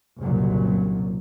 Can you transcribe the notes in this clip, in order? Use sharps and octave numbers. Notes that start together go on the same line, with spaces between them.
F#1 C2 A#2 F#3